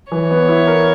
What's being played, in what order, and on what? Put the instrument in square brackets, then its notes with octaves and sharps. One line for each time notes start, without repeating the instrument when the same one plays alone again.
[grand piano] E3 [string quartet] C#5
[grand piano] B3
E4
A#4